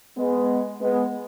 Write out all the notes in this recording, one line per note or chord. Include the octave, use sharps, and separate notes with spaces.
G#3 B3
G#3 B3